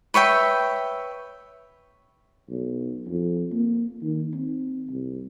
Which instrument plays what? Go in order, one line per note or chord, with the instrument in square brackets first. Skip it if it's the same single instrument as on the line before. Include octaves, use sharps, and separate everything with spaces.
[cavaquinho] B4 C#5 E5 G5
[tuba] B1
F2
A#3
D#3
C4
C2